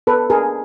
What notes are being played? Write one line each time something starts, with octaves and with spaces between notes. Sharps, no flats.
B3 A4 B4
D4 G#4 A#4